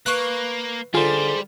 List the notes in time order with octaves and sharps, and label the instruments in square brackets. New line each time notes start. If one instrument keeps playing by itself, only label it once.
[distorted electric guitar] A#3 [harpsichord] B4 F5 [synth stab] C#6 F#6
[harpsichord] D3 [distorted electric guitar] G3 [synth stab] F4 [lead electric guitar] G#4 C5